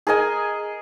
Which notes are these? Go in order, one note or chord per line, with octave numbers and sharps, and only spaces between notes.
G#4 A#4 D#5 G#5